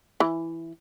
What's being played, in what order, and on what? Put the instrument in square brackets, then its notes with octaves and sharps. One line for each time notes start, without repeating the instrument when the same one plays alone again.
[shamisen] E3